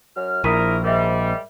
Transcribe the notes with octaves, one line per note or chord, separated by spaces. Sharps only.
F#2 F6
A#1 E4 A#4 D#6 B6 D#7
G#2 G3 A#4 E5